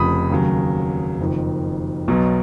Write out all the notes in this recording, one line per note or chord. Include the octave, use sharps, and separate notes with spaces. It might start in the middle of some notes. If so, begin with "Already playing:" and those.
Already playing: F1 F2 C#3 F3 B5 D#6
D#2 C#3 F#3
F#1 F2 D#3
B1 B2 F#3